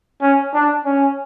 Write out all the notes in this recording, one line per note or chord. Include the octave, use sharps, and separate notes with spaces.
C#4
D4
C#4